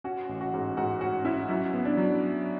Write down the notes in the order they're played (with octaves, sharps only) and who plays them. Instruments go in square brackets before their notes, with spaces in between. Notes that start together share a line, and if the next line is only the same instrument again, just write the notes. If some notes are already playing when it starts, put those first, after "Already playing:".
[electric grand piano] C#4 [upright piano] F#4
[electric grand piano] A1
[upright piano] F#4
[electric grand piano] G#2
[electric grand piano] G#2 [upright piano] F#4
[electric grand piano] C#4 [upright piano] F#4
[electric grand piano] C#4 [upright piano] E4
[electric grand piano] F#3 [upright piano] E4
[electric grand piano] B3
[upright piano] D4
[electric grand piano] F#3